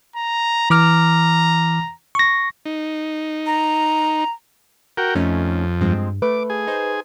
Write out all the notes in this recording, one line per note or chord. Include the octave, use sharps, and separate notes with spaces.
A#5
E3 A#5 D6 F6
C#6 A#6
D#4
A#5
F#4 A#4 G5
F2 A3 C#4 D#4
G2 F3 G#3 C4
A3 B4 D6
G#4
D#4 C5